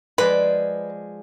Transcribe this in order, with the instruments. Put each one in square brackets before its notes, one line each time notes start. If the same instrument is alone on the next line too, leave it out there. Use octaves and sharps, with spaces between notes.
[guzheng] F3 G#3 D5 [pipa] B4